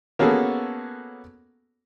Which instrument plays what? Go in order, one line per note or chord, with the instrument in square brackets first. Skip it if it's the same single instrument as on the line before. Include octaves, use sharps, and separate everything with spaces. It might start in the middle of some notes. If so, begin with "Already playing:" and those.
[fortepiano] A#3 B3 C#4 F#4 G#4 A4